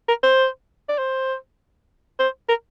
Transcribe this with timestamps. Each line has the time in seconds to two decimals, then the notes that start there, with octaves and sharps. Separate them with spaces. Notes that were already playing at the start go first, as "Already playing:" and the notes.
0.08 A#4
0.23 C5
0.89 D5
0.98 C5
2.19 C5
2.49 A#4